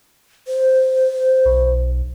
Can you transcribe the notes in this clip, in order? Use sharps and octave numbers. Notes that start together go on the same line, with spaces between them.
C5
B1